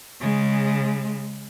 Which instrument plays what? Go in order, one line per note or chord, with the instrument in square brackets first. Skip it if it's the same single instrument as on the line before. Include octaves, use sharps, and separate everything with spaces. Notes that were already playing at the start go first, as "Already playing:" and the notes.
[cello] C#3 G#3